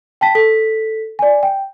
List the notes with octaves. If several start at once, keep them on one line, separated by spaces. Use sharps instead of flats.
G5 A5 B6
A4 B6
D5 G#5
G5